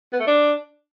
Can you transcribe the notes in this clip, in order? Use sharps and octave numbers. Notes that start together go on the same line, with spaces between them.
B3
A3
D4